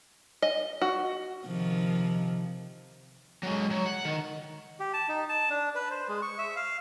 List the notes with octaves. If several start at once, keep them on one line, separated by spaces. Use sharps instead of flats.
D#5
F#4
C3 D#3 F3
F#3 G#3
F#3
F#5
D#3
G4
A5
D#4
A5
D4
B4
C5
G#3
C#6
E5
F5